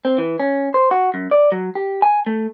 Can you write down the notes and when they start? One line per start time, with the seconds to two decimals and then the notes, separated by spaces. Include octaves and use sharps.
0.05 C4
0.18 E3
0.40 C#4
0.74 C5
0.91 F#4
1.14 F#2
1.31 D5
1.52 F#3
1.75 G4
2.02 G#5
2.26 A3